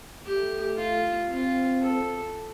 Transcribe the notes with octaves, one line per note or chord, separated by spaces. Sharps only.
A3 G4
F4
C4 F4
A4